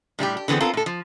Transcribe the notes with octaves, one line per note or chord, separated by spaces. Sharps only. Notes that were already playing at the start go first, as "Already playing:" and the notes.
A2 G3 D#4 G4
G4
D3 E3 B3 C4 G#4
B3 C4 F4 A4 A#4
A2 A4
F3